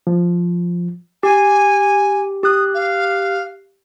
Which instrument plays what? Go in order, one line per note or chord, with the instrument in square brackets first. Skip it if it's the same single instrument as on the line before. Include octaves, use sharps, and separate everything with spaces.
[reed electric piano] F3
[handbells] G4 [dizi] G#5
[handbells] G4 F#6 [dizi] D#6
[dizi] F5